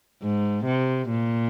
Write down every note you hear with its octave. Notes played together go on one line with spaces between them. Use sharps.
G#2
C3
A#2